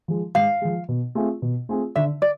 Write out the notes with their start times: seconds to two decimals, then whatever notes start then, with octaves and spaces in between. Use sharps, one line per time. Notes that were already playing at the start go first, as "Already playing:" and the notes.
0.08 F3 G#3
0.35 G#2 F5
0.61 F3 G#3
0.89 B2
1.15 A3 C4 F4 G#4
1.42 B2
1.69 A3 C4 F4 G#4
1.96 D3 E5
2.22 D5